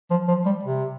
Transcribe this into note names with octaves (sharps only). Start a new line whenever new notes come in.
F3
F3
G3
C3